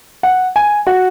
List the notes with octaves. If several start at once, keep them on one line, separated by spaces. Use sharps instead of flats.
F#5
G#5
F#4